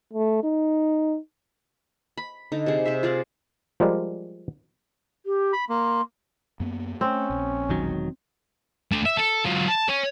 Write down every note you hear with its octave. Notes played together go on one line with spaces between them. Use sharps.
A3
D#4
B5
D3 D#4
C3 G#4
C3 C5 E5
F4 G#4 A#4 D5
F3 G3 G#3 A#4 D5
G4
B5
A#3 C6
F#2 A#3 B3
A3 C4 C#4
A#1
E1 D#3 F#3
A3 D4
E5
A4
F#3 F4
A5
C#5 G#5